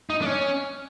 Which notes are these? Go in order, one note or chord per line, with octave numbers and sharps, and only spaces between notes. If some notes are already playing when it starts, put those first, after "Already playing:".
D#4
D4
C#4